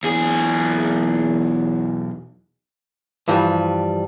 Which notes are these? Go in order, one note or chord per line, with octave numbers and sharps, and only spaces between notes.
B1 E2 G#4
G2 E3 F3 G3